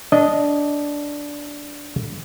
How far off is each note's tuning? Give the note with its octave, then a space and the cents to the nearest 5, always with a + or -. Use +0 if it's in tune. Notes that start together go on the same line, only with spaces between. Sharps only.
D4 -10 D#5 +0